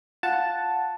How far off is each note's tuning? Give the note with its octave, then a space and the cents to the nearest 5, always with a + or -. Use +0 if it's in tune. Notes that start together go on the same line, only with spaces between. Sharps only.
F4 +10 F#5 +0 A5 +0